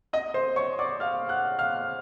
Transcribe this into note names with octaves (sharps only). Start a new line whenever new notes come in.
D#5 D#6
C5 C6
C#5 C#6
D5 D6
F5 F6
F#5 F#6
F5 F6